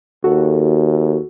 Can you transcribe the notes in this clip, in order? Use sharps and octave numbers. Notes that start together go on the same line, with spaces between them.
D#2 F#4 A4